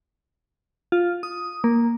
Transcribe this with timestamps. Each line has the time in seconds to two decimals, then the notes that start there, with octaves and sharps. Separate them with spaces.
0.92 F4
1.23 D#6
1.64 A#3